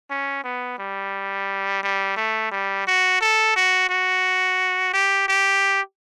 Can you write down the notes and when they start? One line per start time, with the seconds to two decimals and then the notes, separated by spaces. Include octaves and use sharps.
0.10 C#4
0.44 B3
0.78 G3
1.83 G3
2.17 A3
2.51 G3
2.87 F#4
3.21 A4
3.56 F#4
3.89 F#4
4.93 G4
5.28 G4